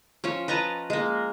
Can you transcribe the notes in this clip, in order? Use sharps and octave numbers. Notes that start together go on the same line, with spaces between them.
F3 C#4 C#5
B4 D#5 A5 A#5
G#3 A#3